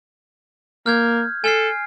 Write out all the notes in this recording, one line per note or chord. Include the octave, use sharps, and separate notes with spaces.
A#3 F6 G6 G#6
A4 G#5 F6 C7